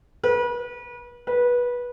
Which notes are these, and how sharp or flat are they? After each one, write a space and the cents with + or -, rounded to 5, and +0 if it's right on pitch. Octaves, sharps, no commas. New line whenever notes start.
B4 -35
B4 -20